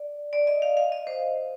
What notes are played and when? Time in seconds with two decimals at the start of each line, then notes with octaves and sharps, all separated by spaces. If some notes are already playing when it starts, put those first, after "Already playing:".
Already playing: D5
0.33 D5
0.47 D#5
0.62 F5
0.77 F5
0.92 D#5
1.07 C5